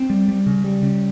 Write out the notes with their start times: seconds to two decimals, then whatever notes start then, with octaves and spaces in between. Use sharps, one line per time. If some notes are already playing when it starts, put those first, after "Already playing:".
Already playing: C4
0.10 G3
0.28 G3
0.46 C#3
0.64 G3
0.83 C#3